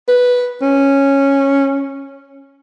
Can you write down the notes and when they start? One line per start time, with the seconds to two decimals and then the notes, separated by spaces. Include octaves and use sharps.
0.08 B4
0.62 C#4